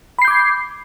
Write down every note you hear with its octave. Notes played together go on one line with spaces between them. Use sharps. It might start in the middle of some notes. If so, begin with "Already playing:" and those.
B5 D6 G6 G#6 C7